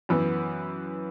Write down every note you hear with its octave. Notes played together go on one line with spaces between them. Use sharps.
F#2 E3 B3